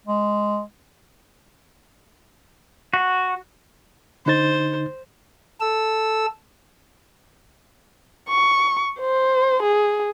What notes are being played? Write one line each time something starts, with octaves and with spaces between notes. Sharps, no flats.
G#3
F#4
D3 D#4 C5 A6
A4 E6
C#6
C5
G#4